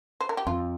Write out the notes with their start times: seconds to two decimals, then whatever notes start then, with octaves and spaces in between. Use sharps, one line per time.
0.21 C5
0.29 A#4
0.37 G4
0.47 F2 F4